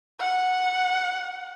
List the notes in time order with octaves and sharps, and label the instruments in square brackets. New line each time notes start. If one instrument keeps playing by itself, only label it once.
[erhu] F#5